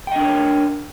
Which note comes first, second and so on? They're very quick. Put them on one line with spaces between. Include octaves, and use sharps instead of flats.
G5 D#5 D4 A#4 C#5